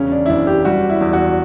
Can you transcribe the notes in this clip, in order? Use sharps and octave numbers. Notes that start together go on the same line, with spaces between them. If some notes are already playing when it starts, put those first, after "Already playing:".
Already playing: E1 C#3 C#4
D4
E4
F#1 D4
G4
G3 F#4
E4
E2
F#4